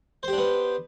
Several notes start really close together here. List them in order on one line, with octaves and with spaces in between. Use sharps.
C5 G4 D4 B3